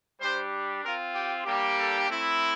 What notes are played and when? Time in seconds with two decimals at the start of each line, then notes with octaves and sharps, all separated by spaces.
0.21 G3 D4 G4 C5
0.83 C4 F4 A#4
1.14 G4
1.45 G3 A#3 D4 G4
1.77 A4
2.08 A3 C4 E4